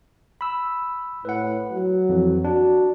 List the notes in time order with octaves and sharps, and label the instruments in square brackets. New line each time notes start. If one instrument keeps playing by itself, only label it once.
[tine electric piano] B5 E6
[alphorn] A2 [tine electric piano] B4 F#5
[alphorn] F#3
[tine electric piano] F2 E3
[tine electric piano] D4 [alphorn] F#4